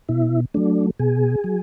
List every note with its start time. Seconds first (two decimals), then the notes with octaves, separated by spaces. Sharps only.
0.09 B2 E4
0.54 F#3 A3 D4
0.99 B2 G#4
1.44 F#3